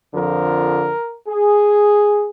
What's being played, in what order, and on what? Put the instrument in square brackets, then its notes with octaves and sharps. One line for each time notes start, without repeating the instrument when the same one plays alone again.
[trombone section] F2 D3 F3 A#4
G#4